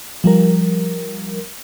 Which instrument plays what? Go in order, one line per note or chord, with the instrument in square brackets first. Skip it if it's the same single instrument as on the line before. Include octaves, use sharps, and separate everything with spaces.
[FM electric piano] F3 G3 A#4